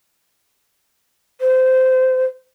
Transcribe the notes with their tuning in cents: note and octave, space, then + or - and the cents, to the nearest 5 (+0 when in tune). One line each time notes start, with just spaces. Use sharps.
C5 -20